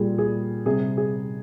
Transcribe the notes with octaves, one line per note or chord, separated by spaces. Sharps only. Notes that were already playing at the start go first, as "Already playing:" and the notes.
Already playing: A#2 G3 G#4
G#4
C3 G3 G#4
G#4